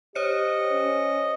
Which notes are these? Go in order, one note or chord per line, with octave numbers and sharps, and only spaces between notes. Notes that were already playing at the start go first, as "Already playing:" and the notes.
G4 C5 C#5 D#5 C#7
C#4